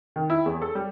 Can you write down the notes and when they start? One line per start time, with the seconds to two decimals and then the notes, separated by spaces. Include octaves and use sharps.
0.16 D#3
0.30 E4
0.46 E2
0.62 A4
0.75 G3